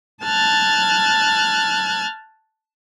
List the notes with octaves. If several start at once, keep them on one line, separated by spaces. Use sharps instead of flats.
A5 F6 F#6 G#6 A6